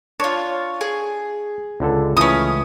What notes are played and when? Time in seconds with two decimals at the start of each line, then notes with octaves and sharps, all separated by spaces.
0.20 D4 F4 C#5
0.81 G#4
1.80 C#2 D3 A4
2.17 C#2 E3 A3 C#4 D#6